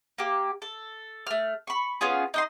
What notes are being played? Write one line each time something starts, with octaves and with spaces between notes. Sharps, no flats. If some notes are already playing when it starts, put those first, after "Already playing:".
A#3 G4
A4
A3 F6
B5 C#6
B3 C#4 F4 G#4
D#4 D#5 C6